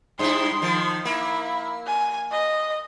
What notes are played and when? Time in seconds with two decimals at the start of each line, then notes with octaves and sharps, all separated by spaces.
0.19 G2 E4 C6
0.62 D#3 F3
1.05 A#3 E4
1.87 G#5
2.32 D#5